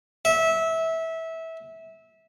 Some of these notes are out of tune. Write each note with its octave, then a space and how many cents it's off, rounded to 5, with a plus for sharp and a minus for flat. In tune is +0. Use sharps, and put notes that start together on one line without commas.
E5 -20